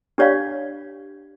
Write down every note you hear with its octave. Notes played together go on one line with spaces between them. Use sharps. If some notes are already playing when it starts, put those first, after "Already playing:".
D4 G4 C#5 D5 F5